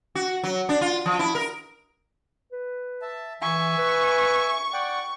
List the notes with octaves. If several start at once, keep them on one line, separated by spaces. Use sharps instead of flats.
F#4
F#3
D4
F4
F3
E4
A#4
B4
E5 A5
E3 E5 G#5 C#6
B4
D5 F#5 G5